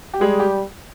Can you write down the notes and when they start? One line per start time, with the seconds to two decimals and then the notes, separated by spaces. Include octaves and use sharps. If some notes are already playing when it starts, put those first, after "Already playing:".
0.14 G4
0.21 G3 G#3 G#4
0.40 G4